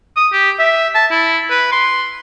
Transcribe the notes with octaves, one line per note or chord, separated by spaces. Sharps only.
D#6
G4
E5
A5
E4
B4
C6